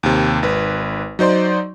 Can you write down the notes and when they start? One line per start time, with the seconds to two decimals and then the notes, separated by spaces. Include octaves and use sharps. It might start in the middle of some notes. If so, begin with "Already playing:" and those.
0.03 D#2 C3
0.43 G#1 B4
1.19 F#3 D#4 C5 D5 C6